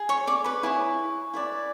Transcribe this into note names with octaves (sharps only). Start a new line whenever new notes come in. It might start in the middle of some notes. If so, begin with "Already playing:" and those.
Already playing: G#4
C#5 C#6
D5 D6
B4 B5
E4 G#4 C#5
E4 B4 D5